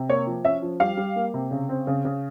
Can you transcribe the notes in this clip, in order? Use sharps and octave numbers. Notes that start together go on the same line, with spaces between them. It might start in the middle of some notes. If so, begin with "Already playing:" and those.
Already playing: C3
A#3 C#5
F3
C#4 E5
F3
G3 F5
G3
A#3
C3
C#3
C4
C#3
C#3